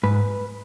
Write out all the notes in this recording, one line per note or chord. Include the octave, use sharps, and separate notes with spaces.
G#2 B4